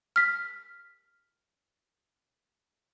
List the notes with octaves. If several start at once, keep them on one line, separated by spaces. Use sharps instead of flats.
F6 B6